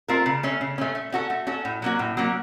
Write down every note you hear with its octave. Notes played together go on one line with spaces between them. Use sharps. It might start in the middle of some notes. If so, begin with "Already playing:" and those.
A3 C4 F4 A#4
C#3
A3 C#4
C#3
A3 C#4
A3
C#4 F#4 A4
A3
C#4 F#4 A4
A2
F#3 A#3 C#4 F#4
A2
F#3 A#3 C#4 F#4